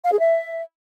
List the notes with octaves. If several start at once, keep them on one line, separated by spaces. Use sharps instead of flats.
F5
G#4
E5